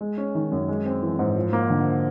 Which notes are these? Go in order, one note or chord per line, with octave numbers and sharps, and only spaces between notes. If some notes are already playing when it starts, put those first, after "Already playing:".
G#3
C#4
D#3
F#2
G#3
C4
E3
G#2
F3
A#3
D3